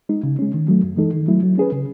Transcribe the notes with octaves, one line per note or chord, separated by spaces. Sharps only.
G#3 D#4
C#3
G#3 C#4
D#3
F#3 A3
F#2
E3 G#3 D#4 A4
D#3
F#3 A3 E4
F#3
C#4 G#4 B4
C#3